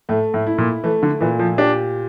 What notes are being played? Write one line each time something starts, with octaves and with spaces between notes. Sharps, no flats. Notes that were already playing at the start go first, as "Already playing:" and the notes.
A2 A3
A2
E4
A#2
E3 A3
D3
A#2 E3
F3
D4 G4